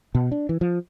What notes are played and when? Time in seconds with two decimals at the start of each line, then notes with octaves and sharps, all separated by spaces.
0.15 B2
0.31 D4
0.49 E3
0.61 F3